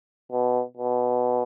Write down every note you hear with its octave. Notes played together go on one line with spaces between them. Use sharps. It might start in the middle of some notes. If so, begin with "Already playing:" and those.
B2
B2